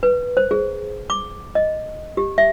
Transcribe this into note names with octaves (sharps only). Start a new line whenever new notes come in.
B4
C5
G#4
D6
D#5
G4
E5